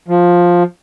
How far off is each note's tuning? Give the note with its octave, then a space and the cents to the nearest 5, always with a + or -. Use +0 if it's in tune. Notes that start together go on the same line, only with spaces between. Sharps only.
F3 +10